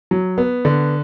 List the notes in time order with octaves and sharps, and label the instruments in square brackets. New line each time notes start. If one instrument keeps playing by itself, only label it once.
[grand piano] F#3
B3
D3